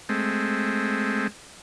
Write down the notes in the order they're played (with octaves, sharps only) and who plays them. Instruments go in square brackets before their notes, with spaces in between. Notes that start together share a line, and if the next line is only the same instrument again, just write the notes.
[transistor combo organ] G#3 A3 C4